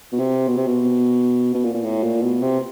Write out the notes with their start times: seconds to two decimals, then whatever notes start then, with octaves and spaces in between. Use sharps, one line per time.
0.12 B2
0.19 C3
0.48 B2
0.57 C3
0.67 B2
1.54 B2
1.64 A#2
1.74 A#2
1.84 A2
2.03 A#2
2.22 B2
2.42 C3